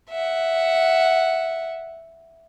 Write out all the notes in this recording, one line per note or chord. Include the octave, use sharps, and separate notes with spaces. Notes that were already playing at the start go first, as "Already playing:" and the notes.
E5 F#5